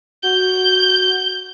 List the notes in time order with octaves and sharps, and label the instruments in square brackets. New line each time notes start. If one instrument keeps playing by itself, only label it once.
[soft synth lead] F#4 [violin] G6